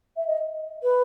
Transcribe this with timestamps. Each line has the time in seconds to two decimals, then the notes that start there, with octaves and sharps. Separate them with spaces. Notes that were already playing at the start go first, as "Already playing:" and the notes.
0.17 E5
0.27 D#5
0.83 B4